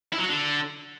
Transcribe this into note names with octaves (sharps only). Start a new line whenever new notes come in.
E4
F#3
F#4
D3